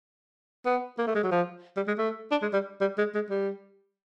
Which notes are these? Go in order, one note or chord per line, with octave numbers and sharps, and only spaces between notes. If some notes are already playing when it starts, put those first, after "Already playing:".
B3
A#3
A3
G#3
F#3
F3
G3
G#3
A3
D4
G#3
G3
G3
G#3
G#3
G3